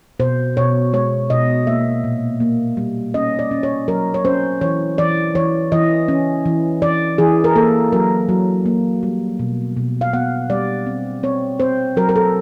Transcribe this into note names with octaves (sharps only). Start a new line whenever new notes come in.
B2 C5
B2 C#5
G#3 C#5
B2 D#5
A#3 E5
A#2
A#3
G3
C#4 D#5
D5
C#4
C#5
F#3 A#4
C#5
C#4 C5
E3 C#5
E3 D5
E3 C#5
E3 D#5
C#4
E3
E3 D5
E3 G#4
A#4
A#3 A4
F#3 A#4
F#3
A#3
G3
B2
B2
F5
B3 F#5
G3 D5
C4
C4 C#5
C4 C5
F#3 A#4
A#4
A4